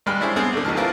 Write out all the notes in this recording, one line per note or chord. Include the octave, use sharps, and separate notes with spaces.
G2 G3 G#3 G5 B5 F6
C#4 D4 E4 G#4 C5 G#5
B3 C4 D4 G#4 C5
D3 A3
D#2 F#3 D#4 A5 F6
C4 D4 E4 F4 A#4 B4